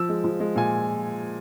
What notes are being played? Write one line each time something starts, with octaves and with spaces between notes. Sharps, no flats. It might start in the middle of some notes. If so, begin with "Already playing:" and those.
Already playing: F3 E6
G#3
F3
G#3
A#2 G#5